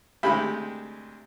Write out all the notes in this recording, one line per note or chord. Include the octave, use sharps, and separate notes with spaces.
D2 C3 G#3 E4 G4 B5